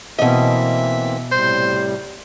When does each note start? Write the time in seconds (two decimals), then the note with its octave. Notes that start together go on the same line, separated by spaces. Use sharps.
0.19 B2 E3 A#3 C4 D#5 E5
1.32 A2 C3 G3 C5